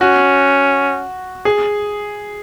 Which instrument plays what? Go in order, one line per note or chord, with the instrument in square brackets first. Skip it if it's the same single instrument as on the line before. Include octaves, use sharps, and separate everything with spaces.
[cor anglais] C#4 [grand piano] F#4
[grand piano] G#4